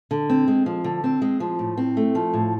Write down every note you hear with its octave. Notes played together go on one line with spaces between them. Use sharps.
D3
C4
G#3
F3
D3
C4
G#3
F3
A2
C4
A3
F3
A2